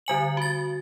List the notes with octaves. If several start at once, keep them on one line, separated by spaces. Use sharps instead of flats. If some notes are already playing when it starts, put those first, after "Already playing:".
D3 G3 G#5 F#7
F#4 A6